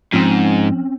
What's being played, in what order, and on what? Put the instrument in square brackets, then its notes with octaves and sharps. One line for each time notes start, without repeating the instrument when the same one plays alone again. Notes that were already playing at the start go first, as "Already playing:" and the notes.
[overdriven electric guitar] G#2 [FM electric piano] F3 [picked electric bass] C4 C#4